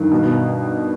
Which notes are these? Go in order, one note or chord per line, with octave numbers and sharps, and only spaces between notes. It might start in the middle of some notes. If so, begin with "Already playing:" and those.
Already playing: G2 D#3
B2